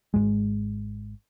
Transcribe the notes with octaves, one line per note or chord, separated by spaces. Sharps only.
G#1 E2 G#3